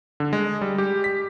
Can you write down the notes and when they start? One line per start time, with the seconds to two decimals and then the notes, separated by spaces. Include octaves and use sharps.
0.20 D3
0.33 G#3
0.61 G3
0.78 G4
1.04 B6